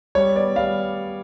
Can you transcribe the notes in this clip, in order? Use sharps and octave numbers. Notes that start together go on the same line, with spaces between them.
G3 C#5
B3 D5
G3 F5